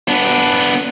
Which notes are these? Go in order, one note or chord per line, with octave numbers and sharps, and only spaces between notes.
B3 D4